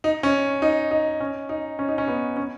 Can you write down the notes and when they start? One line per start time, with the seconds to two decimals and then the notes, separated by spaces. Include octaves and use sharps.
0.04 D#4
0.23 C#4
0.62 D#4
0.91 D#4
1.20 C#4
1.49 D#4
1.79 C#4
1.88 D#4
1.98 C#4
2.08 B3
2.37 C#4